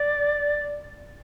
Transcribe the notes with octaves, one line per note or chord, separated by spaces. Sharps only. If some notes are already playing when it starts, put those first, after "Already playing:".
Already playing: D5